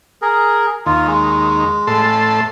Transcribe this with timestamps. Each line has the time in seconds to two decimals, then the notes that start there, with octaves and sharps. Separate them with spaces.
0.22 G#4 A#4
0.86 D#2 F4
1.07 G#3
1.87 A2 A4 C6